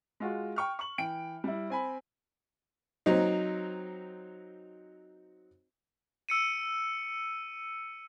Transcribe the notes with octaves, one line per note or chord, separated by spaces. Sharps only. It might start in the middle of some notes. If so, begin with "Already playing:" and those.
G#3 F4 F#4
G5 C#6 F6
C#6 F#7
E3 G5 D7
G3 E4
C4 G#5 B5
F#3 C4 D#4
E6 C#7 D#7